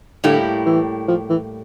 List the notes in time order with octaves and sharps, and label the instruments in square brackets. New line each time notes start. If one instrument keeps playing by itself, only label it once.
[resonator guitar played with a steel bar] A2 G3 A#3 E4 G4 [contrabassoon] D3
[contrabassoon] E3
F3
E3